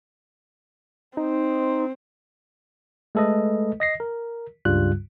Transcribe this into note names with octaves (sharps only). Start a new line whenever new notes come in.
C4 D#4
G#3 A3 A4 B4 D#5
D#5 A#6 C7
A#4
C#2 G2 C#3 G3 F4 F#6